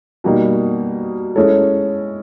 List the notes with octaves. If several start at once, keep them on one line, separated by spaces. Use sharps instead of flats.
B2 G3 A#3 D#4
G#3 C#4 E4 A4 C#5